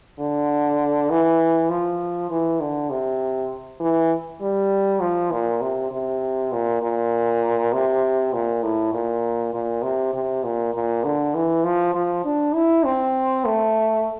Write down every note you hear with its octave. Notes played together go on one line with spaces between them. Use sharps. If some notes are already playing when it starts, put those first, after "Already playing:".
D3
E3
F3
E3
D3
C3
E3
G3
F3
A#2
C3
C3
A#2
A#2
C3
A#2
A2
A#2
A#2
C3
C3
A#2
A#2
D3
E3
F3
F3
D4
E4
C4
A3